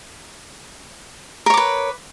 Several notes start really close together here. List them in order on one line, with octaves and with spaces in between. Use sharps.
A#4 C#5 D6 B4